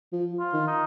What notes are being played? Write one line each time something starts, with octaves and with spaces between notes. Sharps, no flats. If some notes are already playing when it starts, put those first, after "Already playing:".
F3
F4
D#3
D#4